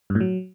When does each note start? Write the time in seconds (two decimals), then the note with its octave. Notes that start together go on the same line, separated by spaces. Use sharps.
0.10 G2
0.15 A2
0.20 F#3